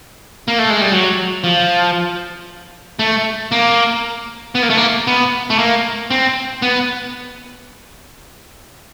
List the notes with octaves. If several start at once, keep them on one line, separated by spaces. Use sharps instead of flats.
A#3
A3
G#3
G3
F#3
F3
A3
A#3
B3
A#3
A3
A#3
B3
A3
A#3
C4
B3